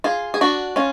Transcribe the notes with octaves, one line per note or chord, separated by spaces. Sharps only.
F4 G#4
G#4
D4 F#4
C#4 F4